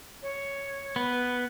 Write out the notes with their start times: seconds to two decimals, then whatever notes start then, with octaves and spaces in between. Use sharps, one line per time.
0.22 C#5
0.96 B3 B4